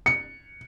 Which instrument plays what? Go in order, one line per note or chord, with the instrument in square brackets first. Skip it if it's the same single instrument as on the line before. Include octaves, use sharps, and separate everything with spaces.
[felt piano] C#7